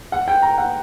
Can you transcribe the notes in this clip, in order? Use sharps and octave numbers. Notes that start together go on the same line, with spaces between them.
F#5
G5
A#5
F#5